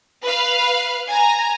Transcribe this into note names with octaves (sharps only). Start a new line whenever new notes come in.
B4 F5
G#5 A#5